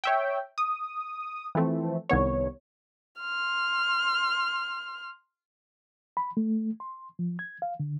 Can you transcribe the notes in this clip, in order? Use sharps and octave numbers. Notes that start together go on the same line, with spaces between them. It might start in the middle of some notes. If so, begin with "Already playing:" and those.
C#5 E5 G5
D#6
E3 F3 A3 C4
C2 D#3 B3 C#5
C6 F6
B5
A3
C6
F3
G#6
F5
D3